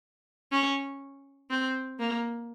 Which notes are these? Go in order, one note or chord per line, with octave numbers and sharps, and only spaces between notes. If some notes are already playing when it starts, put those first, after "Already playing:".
C#4
C4
A#3